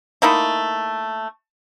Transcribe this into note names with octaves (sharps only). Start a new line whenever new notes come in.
A3 A#3 D#4 E4